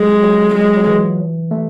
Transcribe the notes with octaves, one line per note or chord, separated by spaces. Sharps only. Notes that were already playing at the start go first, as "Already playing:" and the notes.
Already playing: F#3 G#3
F#3
G#3
F#3
E3
A3